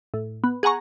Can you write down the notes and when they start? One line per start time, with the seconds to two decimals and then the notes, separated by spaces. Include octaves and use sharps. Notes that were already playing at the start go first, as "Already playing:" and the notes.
0.14 A2
0.44 B3
0.63 G#4 F#5 G#5 A#5 C#6